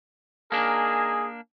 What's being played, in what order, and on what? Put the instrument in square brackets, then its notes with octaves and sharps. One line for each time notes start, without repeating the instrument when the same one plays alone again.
[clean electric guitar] A#3 D4 [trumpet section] D#4 A#4 G#5 [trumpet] G#4